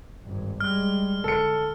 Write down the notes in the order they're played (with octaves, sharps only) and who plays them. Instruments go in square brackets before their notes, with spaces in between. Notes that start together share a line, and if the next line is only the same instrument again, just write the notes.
[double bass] G#1 G2
[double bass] G3 G#3 [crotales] F6
[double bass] D3 [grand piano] A4 C#7